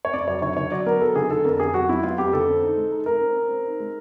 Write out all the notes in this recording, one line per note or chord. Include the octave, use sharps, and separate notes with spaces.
C#5
F2 D5
F#3 C#5
D3 C#5
D3 C#5
F#3 D5
B3 A#4
F#3 A4
D3 G#4
D3 A4
F2 A#4
F2 G#4
F#3 F#4
F#3 E4
B3 F4
F2 G4
D3 A4
C4
D#4
G#3
D#4
D#4 A#4
C4
C4
C4
D#4
G#3